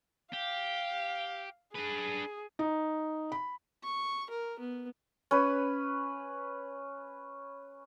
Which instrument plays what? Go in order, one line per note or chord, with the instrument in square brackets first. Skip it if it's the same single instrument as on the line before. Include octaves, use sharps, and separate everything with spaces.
[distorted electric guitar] G4 [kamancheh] F5
[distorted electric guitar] D4 B4 [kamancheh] G#4
[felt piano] D#4
B5
[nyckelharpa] C#6
A#4
B3
[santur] C#4 B4